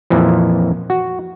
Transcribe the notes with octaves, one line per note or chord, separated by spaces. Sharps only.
F2 A#2 E3 F3
F#4